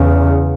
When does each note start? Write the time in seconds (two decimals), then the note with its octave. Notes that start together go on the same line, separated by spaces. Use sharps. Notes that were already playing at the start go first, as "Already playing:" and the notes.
Already playing: E2 C#3